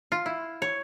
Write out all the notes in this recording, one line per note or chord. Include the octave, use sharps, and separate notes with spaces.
F4
E4
C#5